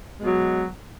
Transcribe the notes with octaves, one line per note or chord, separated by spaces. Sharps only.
B2 F#3 G#3